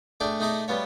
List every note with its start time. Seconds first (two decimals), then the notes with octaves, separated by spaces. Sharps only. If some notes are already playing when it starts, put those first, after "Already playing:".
0.20 A3 D4 G#4 D5 G5
0.40 A3 D#4 G#4 A#5 D6 D#6
0.68 G3 B3 F4 C#5